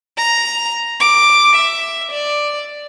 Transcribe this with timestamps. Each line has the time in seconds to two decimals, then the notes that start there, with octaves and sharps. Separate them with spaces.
0.18 A#5
1.00 D6
1.56 E5
2.12 D5